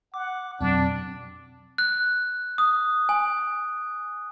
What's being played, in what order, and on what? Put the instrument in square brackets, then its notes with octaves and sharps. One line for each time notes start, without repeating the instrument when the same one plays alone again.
[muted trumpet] F#5 [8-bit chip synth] D6
[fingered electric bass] F2 B2 F#3 [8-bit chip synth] C4 [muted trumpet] D4
[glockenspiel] F#6
D#6
G#5